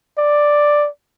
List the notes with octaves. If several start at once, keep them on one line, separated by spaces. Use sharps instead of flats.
D5